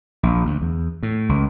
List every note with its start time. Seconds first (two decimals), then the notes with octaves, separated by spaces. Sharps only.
0.23 A#1
0.45 D2
0.62 E2
1.03 A2
1.29 C#2